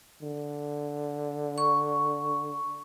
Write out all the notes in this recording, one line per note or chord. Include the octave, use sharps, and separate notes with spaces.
D3
C#6